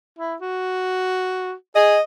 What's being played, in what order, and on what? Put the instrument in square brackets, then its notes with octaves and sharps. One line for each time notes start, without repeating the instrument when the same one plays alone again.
[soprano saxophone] E4
F#4
[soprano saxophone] G#4 [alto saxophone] D#5